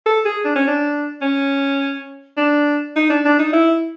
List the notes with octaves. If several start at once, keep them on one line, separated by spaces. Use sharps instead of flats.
A4
G#4
D4
C#4
D4
C#4
D4
D#4
D4
D4
D#4
E4